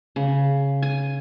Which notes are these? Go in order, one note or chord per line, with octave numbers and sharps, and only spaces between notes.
C#3
G#5